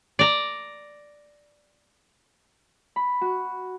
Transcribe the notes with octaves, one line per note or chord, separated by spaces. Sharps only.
D5 A#5
B5
F#4